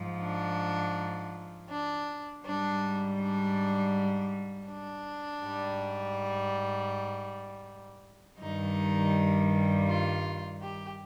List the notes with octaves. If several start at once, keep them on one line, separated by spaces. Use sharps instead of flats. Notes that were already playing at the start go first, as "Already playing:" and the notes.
Already playing: G#2 F3
D4
D4
G#2 G3 D4
D4
D4
G#2 G3
G2 D#3 G3 D#4
F4
G4